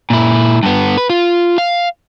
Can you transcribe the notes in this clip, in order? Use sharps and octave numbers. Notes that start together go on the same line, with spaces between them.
A#2 E4
G2 B3
B4
F4
F5